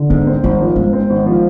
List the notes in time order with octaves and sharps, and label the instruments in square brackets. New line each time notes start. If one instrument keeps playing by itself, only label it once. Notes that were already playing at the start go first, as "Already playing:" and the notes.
Already playing: [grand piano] D3
[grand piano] G#2 [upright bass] G#3
[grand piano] C4
[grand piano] G#1 [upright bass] G#3
[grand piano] F3
[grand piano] G#2 [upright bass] G#3
[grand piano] C4
G#1
F3